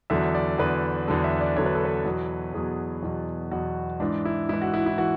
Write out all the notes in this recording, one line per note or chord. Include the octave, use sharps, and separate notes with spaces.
E2 D3 F#3 E5
D5
E2 D3 F#3 B4
E2 D3 F#3 A4
E5
D5
E2 D3 F#3 C#5
B4
A4
B4
E2 B2 F#3
E2 B2 F#3 G#4
E2 B2 F#3
E2 B2 F#3 F#4
G#2 E3 D4
E4
G#2 E3 E4
F#4
E4
E4
E3 F#4